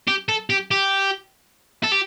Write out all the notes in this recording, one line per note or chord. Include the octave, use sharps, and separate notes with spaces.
G4
A4
G4
G4
A4
G4